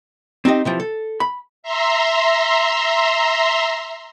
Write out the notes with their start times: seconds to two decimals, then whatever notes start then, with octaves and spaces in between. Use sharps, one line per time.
0.45 C4 D#4 G4 D#5
0.65 C3 E3 F3
0.80 A4
1.20 B5
1.63 E5 A#5 C6